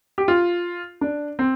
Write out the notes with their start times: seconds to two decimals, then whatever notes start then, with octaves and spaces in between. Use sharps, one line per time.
0.18 G4
0.28 F4
1.01 D4
1.39 C4